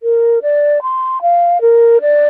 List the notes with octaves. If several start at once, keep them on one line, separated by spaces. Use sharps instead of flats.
A#4
D5
C6
F5
A#4
D5